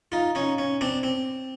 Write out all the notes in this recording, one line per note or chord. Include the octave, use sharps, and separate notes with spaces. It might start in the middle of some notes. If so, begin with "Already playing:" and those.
D#4 F4
C#4 D#4
C#4
C4 D4
C4